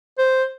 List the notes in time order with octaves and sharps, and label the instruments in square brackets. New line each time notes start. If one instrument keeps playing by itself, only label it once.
[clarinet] C5